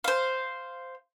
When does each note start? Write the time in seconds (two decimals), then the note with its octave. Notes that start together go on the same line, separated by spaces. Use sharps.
0.04 C5 F5